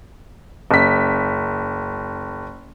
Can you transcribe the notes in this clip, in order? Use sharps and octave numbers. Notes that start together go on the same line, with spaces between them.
F#1 B6